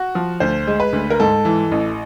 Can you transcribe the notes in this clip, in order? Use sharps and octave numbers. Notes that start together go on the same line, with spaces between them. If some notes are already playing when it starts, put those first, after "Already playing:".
Already playing: F#4
F3
D2 C5
G#3
B4
D2
A#4
G#2 A4
E3
A1